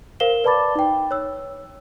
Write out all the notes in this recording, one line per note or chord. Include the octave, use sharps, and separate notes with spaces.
A#4 C5 F5 C7 E7 G7
B4 D5 A5 B5 D6 A6
D#4 G5
C#5 E6